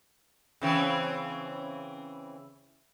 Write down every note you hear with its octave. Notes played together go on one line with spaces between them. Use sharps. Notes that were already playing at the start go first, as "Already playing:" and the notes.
C#3 E3 C4